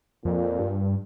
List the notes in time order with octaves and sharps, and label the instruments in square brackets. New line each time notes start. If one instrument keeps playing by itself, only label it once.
[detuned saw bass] F2 [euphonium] A#2
[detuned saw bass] G2